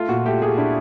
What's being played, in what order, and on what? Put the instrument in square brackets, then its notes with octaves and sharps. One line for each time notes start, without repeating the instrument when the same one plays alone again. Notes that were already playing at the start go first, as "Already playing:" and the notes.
Already playing: [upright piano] A3 [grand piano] F4
[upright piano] A#2 [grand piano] F#4
[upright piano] A3 [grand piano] G4
[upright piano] A3 [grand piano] G#4
[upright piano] D4 [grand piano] E4